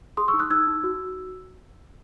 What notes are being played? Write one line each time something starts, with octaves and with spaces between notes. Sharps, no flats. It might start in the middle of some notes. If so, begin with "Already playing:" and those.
G#4 C6 D#6
C#6 E6
D#4
D#6 F#6
D#4 E6 G#6
D#4
F#4